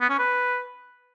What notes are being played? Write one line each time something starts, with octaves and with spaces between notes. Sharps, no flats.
B3
C#4
B4